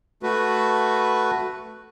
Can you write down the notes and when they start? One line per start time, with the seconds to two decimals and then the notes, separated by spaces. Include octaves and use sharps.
0.23 A3 F#4 B4